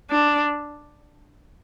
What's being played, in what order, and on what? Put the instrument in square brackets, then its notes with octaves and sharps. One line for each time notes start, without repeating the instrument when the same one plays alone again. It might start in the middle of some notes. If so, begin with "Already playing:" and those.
[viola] D4